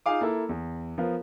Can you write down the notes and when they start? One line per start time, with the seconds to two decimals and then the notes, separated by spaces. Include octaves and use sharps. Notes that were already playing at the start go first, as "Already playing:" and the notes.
0.06 D#4 F4 G#4 F5 D6
0.21 A#3 E4 A4
0.49 E2
0.98 F3 B3 A#4 F5